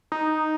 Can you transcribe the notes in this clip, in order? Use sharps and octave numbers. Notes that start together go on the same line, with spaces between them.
D#4